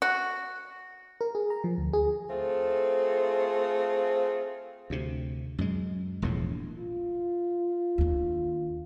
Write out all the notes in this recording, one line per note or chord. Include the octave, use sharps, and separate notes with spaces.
F#4
A#4
G#4
A#5
F3
D2
G#4
A3 C4 F4 G#4 A4
D2 C3
F#2 G#3
E1 A#1 E2 A2
F4
D#2 D4